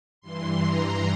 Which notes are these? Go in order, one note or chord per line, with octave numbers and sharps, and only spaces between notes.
G2 E3 C6
A#5